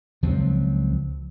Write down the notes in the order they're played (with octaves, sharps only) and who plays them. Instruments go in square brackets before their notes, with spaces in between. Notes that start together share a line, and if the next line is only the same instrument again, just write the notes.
[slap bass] C#2 F3 F#3 C4